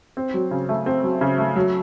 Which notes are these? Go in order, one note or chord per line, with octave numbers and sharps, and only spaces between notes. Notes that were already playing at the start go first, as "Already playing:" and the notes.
C4
F#3
C#3
A3
C4
F#3
C#3
A3
F#3